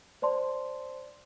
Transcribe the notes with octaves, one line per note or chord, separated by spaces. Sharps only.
C5 D5 A5 C6